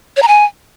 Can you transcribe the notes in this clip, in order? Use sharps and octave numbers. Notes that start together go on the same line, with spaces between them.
C#5
A#5
G#5